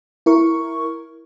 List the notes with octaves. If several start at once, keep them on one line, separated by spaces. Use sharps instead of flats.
E4 A#4 C#6